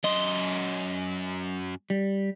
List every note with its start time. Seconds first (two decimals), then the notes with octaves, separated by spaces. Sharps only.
0.04 F#2 D#5 C6
1.90 G3